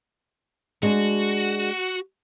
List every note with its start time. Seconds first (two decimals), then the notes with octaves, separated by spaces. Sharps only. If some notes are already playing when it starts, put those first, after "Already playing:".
0.83 G#3 D4 F#4